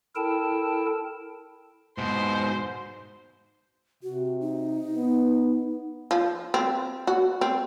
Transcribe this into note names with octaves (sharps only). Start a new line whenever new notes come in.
E4 A4 A#4 G5 A5
G#2 B2 C5
C3 F#4
D#4
B3
F3
C4
F#4
C4